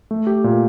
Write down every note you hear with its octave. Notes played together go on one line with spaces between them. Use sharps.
A3
G4
A#2